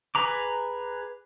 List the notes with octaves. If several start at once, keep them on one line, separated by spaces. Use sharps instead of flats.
G#4 B4 A#5 D6